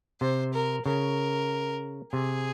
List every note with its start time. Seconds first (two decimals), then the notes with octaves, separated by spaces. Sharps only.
0.21 C3 C5
0.53 A#4
0.85 C#3 A#4
2.13 C3 G#4